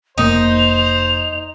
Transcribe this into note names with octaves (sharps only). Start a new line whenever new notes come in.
F1 A#3 D#4 C5 F7